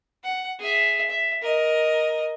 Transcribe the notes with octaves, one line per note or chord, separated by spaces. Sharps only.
F#5
G#4 E5
E5
A#4 D#5